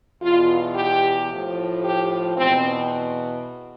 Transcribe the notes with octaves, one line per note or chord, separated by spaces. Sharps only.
E2 B2 F4
G4
A2 F3
G4
E2 B2 C4